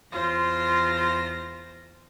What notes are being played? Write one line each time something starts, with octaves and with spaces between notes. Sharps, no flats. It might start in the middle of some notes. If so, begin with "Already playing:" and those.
E2 F4 C5 A#6